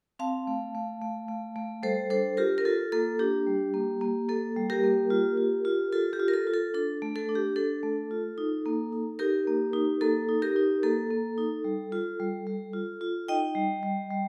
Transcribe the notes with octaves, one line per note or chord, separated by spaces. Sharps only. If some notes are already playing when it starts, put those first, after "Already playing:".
C4 F5 A5
A3
A3
A3
A3
A3
G3 A4 C5
D4 A4 C5
F4 G4 A#4
A#4
F4 A4
A#3 A4
D4 G4
G3
A#3
A#3
A#3 A4
G3
G4 A#4
A#3
F4
F4
F4
F4 A4
G4
F4
A#4
A4
F4
A4
D4 A4
A3
A4
D4
G4
D4 A4
A3
F4
D#4
A#3
D#4
D#4 G4 A#4
A#3
D#4
A#3 A4
D#4
G4 A#4
D#4
A#3 A4
A#3
D#4
G3
F4
G3
G3
F4
F4
D#4 D#5 G5
G3
G3
G3